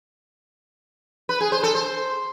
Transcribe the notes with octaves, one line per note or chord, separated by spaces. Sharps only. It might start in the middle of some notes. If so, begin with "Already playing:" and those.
B4
G#4
C5
A4
C5